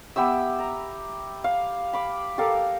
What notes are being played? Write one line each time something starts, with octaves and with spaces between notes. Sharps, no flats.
B3 G4 E5 E6
A#5
F5
B5 D6
G4 A4 A#4 F5